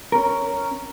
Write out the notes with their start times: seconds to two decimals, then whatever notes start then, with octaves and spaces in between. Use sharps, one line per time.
0.12 C#4 A#4